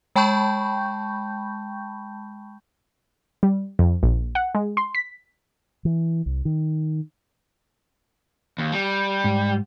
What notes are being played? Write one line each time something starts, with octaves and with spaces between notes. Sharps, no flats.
G#3 G5 A5 B5 C#6 G6
G3
F2
A#1
F#5
G#3
C6
B6
E3
C2
D#3
D#2
G3
G#2